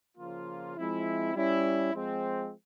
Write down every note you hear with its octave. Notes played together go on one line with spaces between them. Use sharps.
C#3 F3 A#3 F4
F3 G#3 C4 E4
G3 C#4 E4
F3 G#3 C4